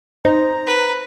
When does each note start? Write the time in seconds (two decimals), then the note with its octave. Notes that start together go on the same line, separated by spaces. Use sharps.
0.25 D#4 C5 A#5
0.67 B4